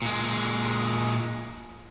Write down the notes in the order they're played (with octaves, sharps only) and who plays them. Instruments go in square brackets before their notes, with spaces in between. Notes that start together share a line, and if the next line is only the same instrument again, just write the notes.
[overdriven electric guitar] A#2 G#3